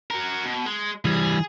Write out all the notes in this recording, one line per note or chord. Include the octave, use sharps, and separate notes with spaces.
F#4 A#4
B2
G#3
E3 G3 G#4